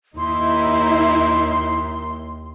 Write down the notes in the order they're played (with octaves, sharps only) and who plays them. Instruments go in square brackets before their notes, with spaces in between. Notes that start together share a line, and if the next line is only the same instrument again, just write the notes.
[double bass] D#2 [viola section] D#4 E4 [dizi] C6